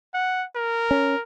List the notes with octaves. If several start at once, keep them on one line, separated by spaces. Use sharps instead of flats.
F#5
A#4
C#4